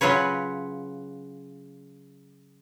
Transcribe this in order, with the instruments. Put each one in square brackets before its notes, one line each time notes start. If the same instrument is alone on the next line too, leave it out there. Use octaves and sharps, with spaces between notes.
[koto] C#3 F#3 F4 B4 C#5